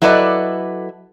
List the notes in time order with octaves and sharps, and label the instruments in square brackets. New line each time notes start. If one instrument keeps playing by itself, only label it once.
[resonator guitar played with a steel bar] F#3 E4 A4 B4 D5 D#5